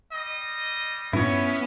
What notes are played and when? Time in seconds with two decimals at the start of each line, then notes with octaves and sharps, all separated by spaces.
0.12 G3 D#5
1.13 G2 A#2 B3 C#4 E4 C#5